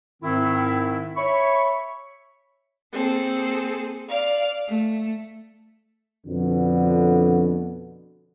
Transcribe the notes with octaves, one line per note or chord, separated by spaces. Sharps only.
G#2 D#3 C4 E4
C#5 E5 B5 C#6
A#3 C4 G#4 A4
D5 F5
A3
F2 B2 D3